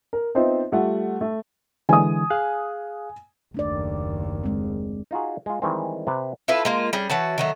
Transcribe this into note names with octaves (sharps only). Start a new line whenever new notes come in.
A#4
B3 C4 D#4 F4 C5 E5
G3 A3 F4 F#5
A3
D3 E3 G#3 G#5 D#6
G#4 F5 F#6
F#1 D#2 A3 D4 D5
G#3 C4
D#4 F4 F#4 G#4
G#3 F4
D#3 E3 G3 G#3 C4
C3 B4
E4 F4 A4 B4
G#3 A#3 F4
G3 C#4 G#4
E3 F#4 C#5 A5
D#3 F#3 A3